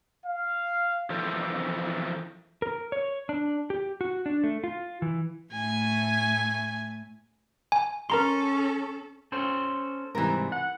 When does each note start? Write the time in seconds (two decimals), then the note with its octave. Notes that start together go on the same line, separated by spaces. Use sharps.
0.25 F5
1.10 E3 F3 F4 A4 A#4 C5
2.62 A#4
2.92 C#5
3.29 D4
3.70 G4
4.01 F#4
4.26 D4
4.44 A3
4.64 F4
5.02 E3
5.53 A2 A3 G#5
7.72 G#5
8.10 C#4 A4 A#4 A#5 C6
9.32 C#4 A4 C5
10.15 G#2 C3 E3 G3 A#4
10.52 F#5